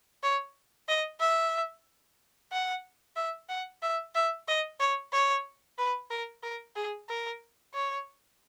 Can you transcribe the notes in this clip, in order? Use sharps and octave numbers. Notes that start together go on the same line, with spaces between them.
C#5
D#5
E5
F#5
E5
F#5
E5
E5
D#5
C#5
C#5
B4
A#4
A#4
G#4
A#4
C#5